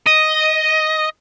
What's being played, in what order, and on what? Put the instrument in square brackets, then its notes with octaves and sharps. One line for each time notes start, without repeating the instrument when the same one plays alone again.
[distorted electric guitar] D#5